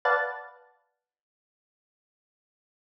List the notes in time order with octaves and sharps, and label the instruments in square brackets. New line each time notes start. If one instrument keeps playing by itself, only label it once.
[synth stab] B4 D5 F5 F#5 A5